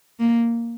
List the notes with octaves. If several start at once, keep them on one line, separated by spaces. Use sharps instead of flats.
A#3